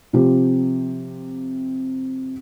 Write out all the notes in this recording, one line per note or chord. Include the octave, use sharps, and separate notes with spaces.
C3 F3 C4 G4